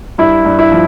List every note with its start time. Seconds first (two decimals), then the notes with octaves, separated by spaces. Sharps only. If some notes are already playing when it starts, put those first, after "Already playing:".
0.18 G2 E4
0.45 G2
0.59 E4
0.72 F3